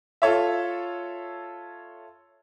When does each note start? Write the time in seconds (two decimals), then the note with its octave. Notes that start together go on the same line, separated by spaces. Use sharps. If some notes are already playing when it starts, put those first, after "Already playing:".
0.22 F4 A4 C#5 E5